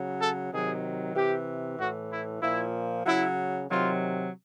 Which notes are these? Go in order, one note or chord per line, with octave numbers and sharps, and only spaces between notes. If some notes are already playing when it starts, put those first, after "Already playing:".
Already playing: C#3 F#3
A4
C3 D#3 F#3 G#4
C3 E3 G4
A2 E3 F#4
E4
A#2 F3 E4
C#3 F#3 E4
C3 D#3 F#3 F4